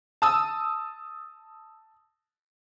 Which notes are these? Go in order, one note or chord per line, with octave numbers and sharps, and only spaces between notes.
A5 D#6 E6